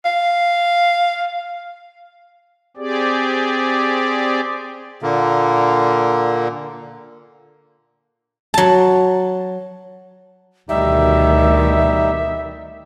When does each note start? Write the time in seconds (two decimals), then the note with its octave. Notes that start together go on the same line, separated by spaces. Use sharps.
0.05 F5
2.77 C4 G4 G#4 D5
5.02 A#2 D3 A#3
8.54 F#3 A5
10.69 D2 B2 D#3 G3 D#4 G4 E5